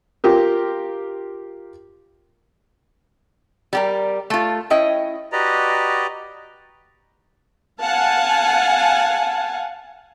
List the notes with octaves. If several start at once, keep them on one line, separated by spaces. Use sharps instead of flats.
F4 G4 A#4
G3 G4 A#4
A3 F4
C#4 E4 D#5 G5
F#4 G4 B4 D5 D#5 A#5
F5 F#5 G#5 A5